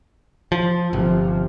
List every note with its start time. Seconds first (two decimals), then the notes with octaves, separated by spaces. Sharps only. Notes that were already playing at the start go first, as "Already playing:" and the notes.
0.52 F3
0.93 G1 C3 F3